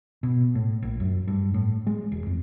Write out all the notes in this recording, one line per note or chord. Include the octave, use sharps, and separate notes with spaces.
B2
A2
A#1
F#2
G2
A2
G#3
E1
F2